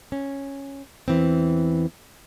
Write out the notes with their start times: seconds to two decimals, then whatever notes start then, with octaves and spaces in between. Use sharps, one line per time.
0.12 C#4
1.08 E2 E3 C4